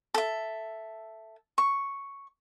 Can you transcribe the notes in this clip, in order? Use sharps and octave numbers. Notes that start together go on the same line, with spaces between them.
A4 E5
C#6